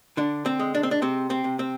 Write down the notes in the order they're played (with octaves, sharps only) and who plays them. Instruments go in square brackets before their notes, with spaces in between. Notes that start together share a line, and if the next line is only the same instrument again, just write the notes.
[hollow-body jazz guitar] D3 D4
C4
G#3
D4
C4
D4
C3 C4
C4
C3
C4